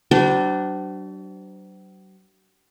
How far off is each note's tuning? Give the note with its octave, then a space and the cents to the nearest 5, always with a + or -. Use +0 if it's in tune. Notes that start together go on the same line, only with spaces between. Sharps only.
F#3 +45 D4 +0 C5 -35